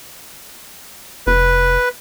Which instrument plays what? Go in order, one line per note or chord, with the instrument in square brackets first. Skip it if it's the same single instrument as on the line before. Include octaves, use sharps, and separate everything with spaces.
[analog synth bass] F1 [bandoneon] B4